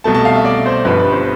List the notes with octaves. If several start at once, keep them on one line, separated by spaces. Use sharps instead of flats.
C2 B2 A3 A5
A5
F5
E5
D5
C5
G1 G2 F3 B3 B4
B4
C5